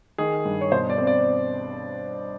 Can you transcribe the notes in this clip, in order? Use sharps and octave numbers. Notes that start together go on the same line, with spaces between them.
D#3 G#4
G2
C#5
B2 C5
D5
C4
D5